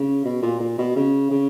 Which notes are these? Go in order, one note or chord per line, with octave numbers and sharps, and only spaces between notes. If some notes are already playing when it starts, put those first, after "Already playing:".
Already playing: C#3
B2
A#2
A#2
B2
C#3
C#3